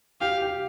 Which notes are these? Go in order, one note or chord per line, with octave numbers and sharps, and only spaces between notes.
G4 F5
G4